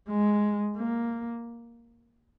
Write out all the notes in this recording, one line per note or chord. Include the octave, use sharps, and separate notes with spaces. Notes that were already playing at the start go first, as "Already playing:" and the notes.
G#3
A#3